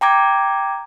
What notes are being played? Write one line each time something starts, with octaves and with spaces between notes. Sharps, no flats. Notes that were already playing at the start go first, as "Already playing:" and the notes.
G5 A#5 D6 G#6